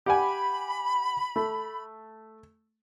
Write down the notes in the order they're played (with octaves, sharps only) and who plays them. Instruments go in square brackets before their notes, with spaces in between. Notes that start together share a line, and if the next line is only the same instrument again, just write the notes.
[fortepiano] G4 F#5 G#5 [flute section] B5
[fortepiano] A3